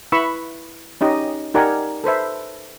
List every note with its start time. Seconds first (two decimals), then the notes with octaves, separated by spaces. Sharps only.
0.12 E4 B4 B5 C#6 E6
1.01 C#4 D#4 G4 D#5
1.54 D#4 G4 A#4 D5 F#5 G#5
2.04 A4 B4 C5 E5